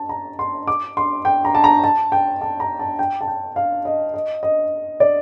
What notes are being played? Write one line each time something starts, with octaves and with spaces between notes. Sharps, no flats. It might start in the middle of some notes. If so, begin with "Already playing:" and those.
Already playing: A5
A#5
C6
D6
C6
G5
A#5
A5
A#5
A5
G5
A5
A#5
A5
G5
A5
G5
F5
D#5
D#5
D#5
D5